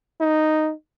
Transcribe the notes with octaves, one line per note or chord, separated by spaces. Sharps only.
D#4